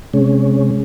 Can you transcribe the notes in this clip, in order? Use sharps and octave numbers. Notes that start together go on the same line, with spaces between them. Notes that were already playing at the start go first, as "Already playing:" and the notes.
C3 G#3 C#4